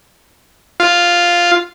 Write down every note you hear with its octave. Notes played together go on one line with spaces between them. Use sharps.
F4